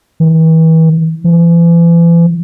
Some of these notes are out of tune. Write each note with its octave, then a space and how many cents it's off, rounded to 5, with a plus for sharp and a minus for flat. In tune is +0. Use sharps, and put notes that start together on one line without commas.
E3 -35
E3 +40